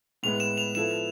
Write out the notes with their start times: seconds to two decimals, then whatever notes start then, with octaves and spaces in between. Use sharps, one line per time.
0.23 A2 G#3 B3 F7
0.40 E7
0.57 F7
0.75 F3 B3 E4 A4 E7